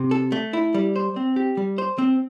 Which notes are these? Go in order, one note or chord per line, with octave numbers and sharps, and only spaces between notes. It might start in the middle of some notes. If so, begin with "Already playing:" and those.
Already playing: C3
A4
A3
E4
G3
C5
C4
G4
G3
C5
C4